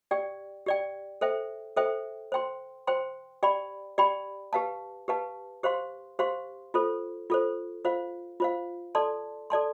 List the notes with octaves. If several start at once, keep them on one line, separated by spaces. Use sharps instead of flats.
G4 D5 G5
G4 D5 G5
A4 C5 E5 G5
A4 C5 E5 G5
C5 G5 C6
C5 G5 C6
G4 D5 G5 B5
G4 D5 G5 B5
G4 B4 F5 A5
G4 B4 F5 A5
G4 C5 F5 C6
G4 C5 F5 C6
F4 A4 C5
F4 A4 C5
F4 C5 F5
F4 C5 F5
A4 D5 A5 C6
A4 D5 A5 C6